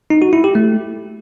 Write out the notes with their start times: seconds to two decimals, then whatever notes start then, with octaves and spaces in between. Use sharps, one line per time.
0.10 D#4
0.22 F#4
0.33 E4
0.44 G4
0.55 A3